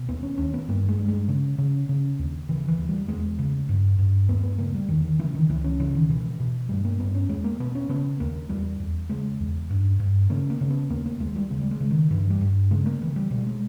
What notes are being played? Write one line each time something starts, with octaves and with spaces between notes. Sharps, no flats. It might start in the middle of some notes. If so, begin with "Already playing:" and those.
Already playing: B2
D#2 B3
C#4
D#2 C#4
B3
G2 A#3
G#3
G2
G#3
C#3
C#3
C#3
D#2
C#3 E3
E3
D#2
G3
E2 G#3
C#3
G2
G2
D#2 B3
B3
C#3 A#3
G3
E2 D#3
D#3
C#3 E3
D#3
C#2 E3
C#4
C#3 E3
D#3
B2 E3
B2
G2 G3
A#3
G2 B3
C#4
E2 G#3
A#3
B2 B3
C#4
C#3 B3
D#2 A#3
E2 G3
E2
C#3 G#3
E2
G2
G2
C#3 A#3
A#3
C#3
B3
D#2 A#3
A#3
D#2 G#3
G3
C#3 G#3
G3
G#3
C#3
D#3
G2 E3
G3
G2
C#3 G#3
A#3
C#3 E3
G3
B2 G3
G#3